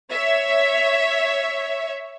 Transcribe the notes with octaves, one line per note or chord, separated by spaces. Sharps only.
C#5 E5